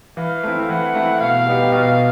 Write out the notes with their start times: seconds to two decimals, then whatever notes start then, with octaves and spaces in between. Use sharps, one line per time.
0.17 E3 F5
0.43 A3 C4 E4
0.69 E3 F#5
0.95 A3 C4 E4
1.21 B2 F5
1.46 G3 B3 D#4 G4
1.72 B2 F5